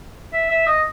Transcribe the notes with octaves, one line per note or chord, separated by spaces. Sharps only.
E5
E5
D#5